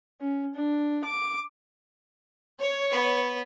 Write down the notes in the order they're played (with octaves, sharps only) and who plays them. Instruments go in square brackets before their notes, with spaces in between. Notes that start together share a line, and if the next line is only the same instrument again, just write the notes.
[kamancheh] C#4
D4
D6
[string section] C#5
[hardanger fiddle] B3 B4